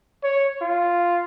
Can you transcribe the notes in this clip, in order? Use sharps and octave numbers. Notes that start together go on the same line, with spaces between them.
C#5
F4